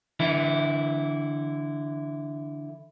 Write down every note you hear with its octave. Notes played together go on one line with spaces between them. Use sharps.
D3 E3 E4